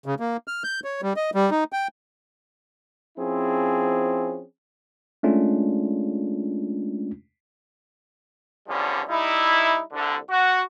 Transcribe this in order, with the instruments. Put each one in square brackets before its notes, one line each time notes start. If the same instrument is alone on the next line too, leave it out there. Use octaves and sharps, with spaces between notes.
[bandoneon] C#3
A#3
F6
G6
C#5
G3
D#5
G3
D#4
G5
[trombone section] F3 C4 C#4 E4 G#4
[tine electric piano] G#3 A3 C#4 D4 F4
[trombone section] E2 D3 F3 G3 C#4
G3 D#4 E4
C2 D3
F#4